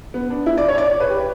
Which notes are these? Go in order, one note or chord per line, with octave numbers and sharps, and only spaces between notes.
B3
D4
E4
D5
C#5
D5
B4
G4